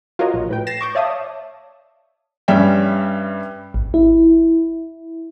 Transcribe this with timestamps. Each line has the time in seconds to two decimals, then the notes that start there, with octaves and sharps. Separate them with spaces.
0.19 F4 F#4 A#4 C#5 D#5
0.34 A#1
0.49 A2 B4 G5
0.67 A6 A#6 C7 E7
0.81 C#6 D6 G6
0.95 C#5 D5 E5 F5 A5 D#6
2.48 G2 G3 C#4 E5 G5
3.74 G#1
3.94 E4